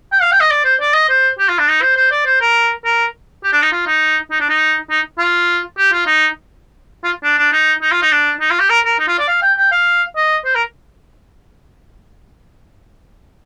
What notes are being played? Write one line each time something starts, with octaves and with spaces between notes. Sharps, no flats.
G5
F5
G5
D#5
D5
C5
D5
D#5
C5
G4
F4
D4
D#4
C5
C5
D5
C5
A#4
A#4
G4
D4
D#4
F4
D#4
D#4
D4
D#4
D#4
F4
G4
F4
D#4
F4
D4
D4
D#4
D#4
F4
D#4
D4
D#4
F4
G4
A#4
A#4
D#4
F4
D5
F5
G5
G5
F5
D#5
C5
A#4